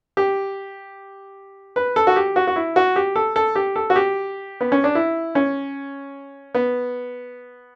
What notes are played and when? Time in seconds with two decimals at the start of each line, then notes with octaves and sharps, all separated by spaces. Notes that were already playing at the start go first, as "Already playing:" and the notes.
0.17 G4
1.76 B4
1.96 A4
2.07 F#4
2.16 G4
2.36 F#4
2.47 F#4
2.56 E4
2.76 F#4
2.96 G4
3.16 A4
3.36 A4
3.56 G4
3.76 A4
3.90 F#4
3.96 G4
4.61 B3
4.72 C#4
4.84 D4
4.95 E4
5.35 C#4
6.55 B3